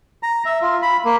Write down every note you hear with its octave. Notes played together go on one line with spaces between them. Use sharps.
A#5
E5
F4
B5
A#3